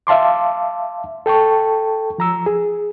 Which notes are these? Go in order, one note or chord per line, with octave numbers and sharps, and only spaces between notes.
E5 F5 A5 C6 D6
A4 G5 A5 C#6
F3 A#5 E6
G#4